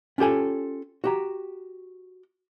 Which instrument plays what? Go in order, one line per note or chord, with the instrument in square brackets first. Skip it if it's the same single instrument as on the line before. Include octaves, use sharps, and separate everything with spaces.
[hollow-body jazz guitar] C#4 F4 G4 A4 G#5
F#4 G4 A#5